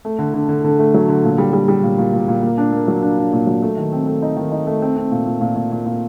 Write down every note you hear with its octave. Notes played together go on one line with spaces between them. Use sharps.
A3
D3
D3
D3
D3
A3
F#3
D3
A#2
G3
G3
G3
A#2
A#2
A#2
A#2
A#3
D4
A#3
F#3
D4
D4
A#2
F#3
A3
D#3
C4
A3
D#4
D#3
D#4
A3
C4
C4
A#2
A#2
A#2
A#2
A#2
A#2